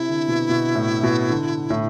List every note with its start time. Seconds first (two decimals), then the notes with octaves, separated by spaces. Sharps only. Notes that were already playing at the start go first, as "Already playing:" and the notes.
Already playing: C3 E4
0.09 D3
0.28 B2
0.49 B2
0.75 A2
1.03 B2
1.30 D3
1.70 A2